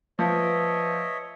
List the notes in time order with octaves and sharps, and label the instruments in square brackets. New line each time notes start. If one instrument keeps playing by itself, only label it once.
[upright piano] F3 [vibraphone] B4 [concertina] C#5 D#5 E5